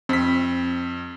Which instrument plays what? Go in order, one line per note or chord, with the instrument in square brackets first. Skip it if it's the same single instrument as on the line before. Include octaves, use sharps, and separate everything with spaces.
[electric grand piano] F2 B6 [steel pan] C4